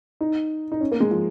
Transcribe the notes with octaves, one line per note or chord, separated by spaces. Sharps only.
D#4
D#4
C#4
A#3
G#3
F3